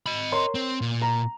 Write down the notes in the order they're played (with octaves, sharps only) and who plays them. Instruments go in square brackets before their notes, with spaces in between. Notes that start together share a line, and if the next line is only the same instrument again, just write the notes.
[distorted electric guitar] D#5 B5
[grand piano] A#4 C#5 C6
[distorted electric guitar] C4
A#2
[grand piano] A#5